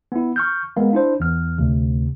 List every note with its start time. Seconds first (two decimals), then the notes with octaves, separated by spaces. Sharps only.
0.12 B3 E4
0.36 C#6 F6 G6
0.77 G#3 B3 A#4 F5
0.93 D4 E4 C5
1.20 E2 F6
1.58 D2 C3